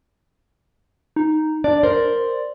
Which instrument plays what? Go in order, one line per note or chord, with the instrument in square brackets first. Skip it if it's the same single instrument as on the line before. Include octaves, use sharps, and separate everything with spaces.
[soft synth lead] D#4
[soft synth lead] D4 [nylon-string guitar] D5
[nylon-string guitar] A#4 C5 [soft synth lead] D5